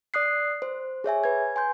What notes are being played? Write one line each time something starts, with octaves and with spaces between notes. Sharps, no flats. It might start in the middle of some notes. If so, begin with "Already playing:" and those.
D5 D#6 F#6 C7
C5
G#4 C#5 E5 G#5
B4 G#6
G#5 C6 G6